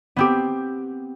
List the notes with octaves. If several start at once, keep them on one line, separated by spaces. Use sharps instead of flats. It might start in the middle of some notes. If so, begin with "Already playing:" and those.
B3 C4 G4